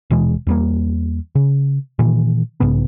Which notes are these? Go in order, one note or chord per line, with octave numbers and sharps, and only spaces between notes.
D#1 B2 E3 G#3
E2 G3 A#3
C#3
A#2 D#3 E3
B1 G#2 C#3 B3